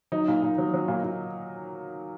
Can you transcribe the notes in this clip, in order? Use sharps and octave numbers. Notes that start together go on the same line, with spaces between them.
F#3 D#4
A#2
A#2
F#3
F#3
A#2
A#2